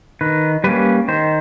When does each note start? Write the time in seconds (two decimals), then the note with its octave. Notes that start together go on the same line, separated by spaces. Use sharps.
0.21 D#3 B4
0.64 G3 A#3 C#4 B4
1.08 D#3 C5